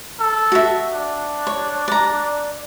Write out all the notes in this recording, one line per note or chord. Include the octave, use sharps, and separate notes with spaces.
A4
F#4 E5
D4
C#5
D5 A#5